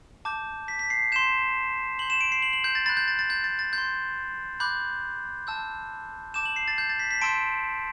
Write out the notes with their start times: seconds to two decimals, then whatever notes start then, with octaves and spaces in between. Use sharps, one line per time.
0.25 A5 D6 G6
0.68 B6
0.79 B6
0.90 C7
1.12 C6 G6 E7
1.99 C6 G6 F#7
2.10 E7
2.21 D7
2.32 C7
2.42 F#7
2.53 F#7
2.64 G6
2.75 A6
2.86 B5 F#6 A6
2.97 G6
3.08 A6
3.19 A6
3.30 G6
3.44 A6
3.59 A6
3.73 C6 G6
4.60 B5 D6 F#6 G6
5.47 A5 E6 G6
6.34 A5 D6 G6 E7
6.46 F#7
6.56 C7
6.68 A6
6.78 G6
6.89 A6
6.99 B6
7.11 B6
7.21 A5 C6 E6 G6 D7